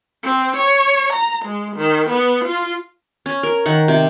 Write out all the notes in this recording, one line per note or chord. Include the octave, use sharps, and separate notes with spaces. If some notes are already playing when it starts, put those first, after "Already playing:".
C4
C#5
A#5
G#3
D#3
B3
F4
C#4
A#4
D#3 F#5
C3